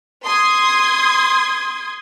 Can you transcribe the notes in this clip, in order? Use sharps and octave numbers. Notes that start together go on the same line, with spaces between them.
C6 D#6 G#6